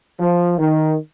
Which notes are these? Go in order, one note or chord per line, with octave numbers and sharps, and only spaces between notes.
F3
D#3